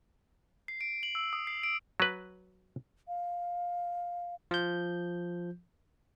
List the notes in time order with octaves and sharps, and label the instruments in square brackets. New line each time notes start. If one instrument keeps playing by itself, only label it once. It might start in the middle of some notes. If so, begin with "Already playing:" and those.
[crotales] C7
D7
F#7
E6
D#6
C7
D7
[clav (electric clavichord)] F#3 B4
[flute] F5
[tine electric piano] F3 G6